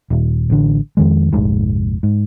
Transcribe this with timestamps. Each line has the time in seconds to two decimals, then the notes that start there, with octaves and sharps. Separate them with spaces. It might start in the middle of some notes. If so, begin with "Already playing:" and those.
0.11 D#1
0.50 A1 D3
0.97 F2 D#3 G#3
1.33 F1 A#1 G#2
2.03 G#2